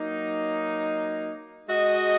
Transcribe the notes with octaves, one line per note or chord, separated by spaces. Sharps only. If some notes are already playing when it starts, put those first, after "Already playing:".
Already playing: F#3 A#3 D#4
G#3 F#4 D#5